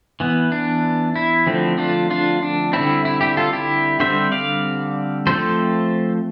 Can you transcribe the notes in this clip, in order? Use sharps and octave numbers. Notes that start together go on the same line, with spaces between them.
E3 B3
D4
E4
D3 F3 A3 C4
D4 F4
D4 F4
D4
D3 G3 C4 E4
E4
E4 G4
F4 A4
E4 G4
D3 G3 C4 C5 E5
D5 F5
F3 A3 C4 A4 C5